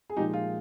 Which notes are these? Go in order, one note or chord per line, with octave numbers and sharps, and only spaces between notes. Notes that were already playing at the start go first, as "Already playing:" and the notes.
G#4
A#2 F3 G#3 D#4 G4
F4